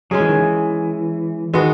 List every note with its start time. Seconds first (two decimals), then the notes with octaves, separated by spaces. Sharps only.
0.11 F#3 G#3 C#4 G#4
0.20 E3
0.29 D#3
0.38 E3
1.54 D#3 G#3 B3 F#4